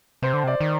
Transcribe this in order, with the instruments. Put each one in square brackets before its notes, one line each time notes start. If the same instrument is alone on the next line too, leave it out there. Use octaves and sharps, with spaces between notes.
[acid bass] C3 [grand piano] C5
[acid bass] D3
[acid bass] C3 [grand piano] D5
[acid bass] D#3